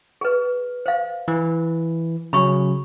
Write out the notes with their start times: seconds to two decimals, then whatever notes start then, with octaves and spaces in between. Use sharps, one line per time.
0.21 G#4 B4
0.86 C5 F5
1.28 E3
2.33 C#3 F#3 C#4 B5 C#6